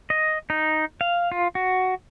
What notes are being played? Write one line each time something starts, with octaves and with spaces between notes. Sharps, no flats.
D#5
D#4
F5
F4
F#4